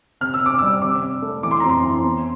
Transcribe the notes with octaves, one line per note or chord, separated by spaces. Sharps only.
C3 F6
E6
C3 D6
G3 E6
C3 D6
C3
A3
E3 D6
C6
A#5
F2
C6
E3
E2